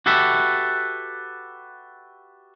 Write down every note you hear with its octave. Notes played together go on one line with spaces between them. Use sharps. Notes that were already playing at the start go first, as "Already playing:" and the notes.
F#4 G4 A4 B4 E5